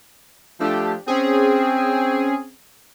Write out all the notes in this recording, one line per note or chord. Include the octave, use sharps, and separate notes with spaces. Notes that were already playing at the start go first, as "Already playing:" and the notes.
F3 A3 D4 G4
C4 C#4 G#4